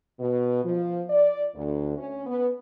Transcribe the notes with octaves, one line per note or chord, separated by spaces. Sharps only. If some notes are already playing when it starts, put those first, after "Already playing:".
B2
F3
D5
D2
C#4
B3